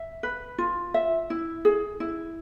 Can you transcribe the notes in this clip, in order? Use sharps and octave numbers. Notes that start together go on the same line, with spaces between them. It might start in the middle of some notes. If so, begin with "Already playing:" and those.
Already playing: E5
B4
F4
E5
E4
G#4
E4